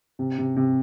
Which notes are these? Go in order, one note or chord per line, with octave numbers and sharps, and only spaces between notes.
C3
C3
C3